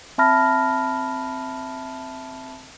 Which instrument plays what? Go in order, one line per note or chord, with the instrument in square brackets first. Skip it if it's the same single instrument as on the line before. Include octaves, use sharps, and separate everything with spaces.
[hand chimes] C4 E5 A5 B5 F6 A#6